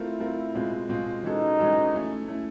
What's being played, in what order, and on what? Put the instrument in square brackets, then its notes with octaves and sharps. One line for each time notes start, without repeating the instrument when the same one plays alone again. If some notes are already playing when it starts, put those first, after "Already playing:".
Already playing: [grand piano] A3 C4 F4 A#4 [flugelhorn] E4
[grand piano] A3 C4 F4 A#4
B2 G#3 C4 F4
B2 G#3 C4 F4
[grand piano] E3 G#3 C#4 F#4 A4 [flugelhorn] D#4
[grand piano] E3 G#3 C#4 F#4 A4
A3 C#4 E4
A3 C#4 E4